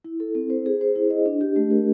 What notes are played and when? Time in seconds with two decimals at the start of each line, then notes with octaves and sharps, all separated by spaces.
0.04 E4
0.20 A4
0.35 C4
0.50 C5
0.66 G#4
0.81 C5
0.96 E4
1.10 D#5
1.26 D4
1.41 G4
1.56 A3
1.71 A#4